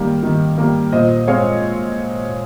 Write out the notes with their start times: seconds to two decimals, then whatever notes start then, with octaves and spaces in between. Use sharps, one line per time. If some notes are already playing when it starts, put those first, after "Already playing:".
Already playing: D#3 G3 A#3
0.23 D#3
0.58 G3 A#3
0.92 A#2 C5 D#5
1.27 G#3 C4 C#5 F5